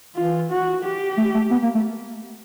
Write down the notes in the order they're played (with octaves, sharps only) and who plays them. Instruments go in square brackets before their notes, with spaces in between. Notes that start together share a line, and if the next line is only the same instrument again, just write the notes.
[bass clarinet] E3 [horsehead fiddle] F4
[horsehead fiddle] F#4
G4
[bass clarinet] A3
A3
B3
A#3
A3